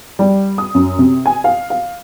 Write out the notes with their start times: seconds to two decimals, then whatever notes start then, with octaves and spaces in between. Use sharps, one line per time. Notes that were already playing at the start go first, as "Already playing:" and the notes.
0.19 G3
0.58 D#6
0.75 F#2
0.99 C3
1.26 G#5
1.44 F5
1.70 F5